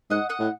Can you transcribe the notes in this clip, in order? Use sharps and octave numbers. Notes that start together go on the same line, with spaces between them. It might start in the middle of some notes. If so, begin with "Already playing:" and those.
G#2 D#5 F#5
D#5 F#5
A2